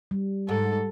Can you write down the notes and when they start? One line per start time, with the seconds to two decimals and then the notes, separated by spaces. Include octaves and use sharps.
0.11 G3
0.49 G#2 A4